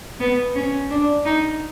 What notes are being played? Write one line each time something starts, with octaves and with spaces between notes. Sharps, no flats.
B3
C#4
D4
D#4